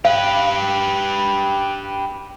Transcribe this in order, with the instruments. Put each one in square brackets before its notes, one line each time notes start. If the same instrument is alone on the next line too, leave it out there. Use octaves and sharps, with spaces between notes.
[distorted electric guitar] G4 B4 [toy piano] F5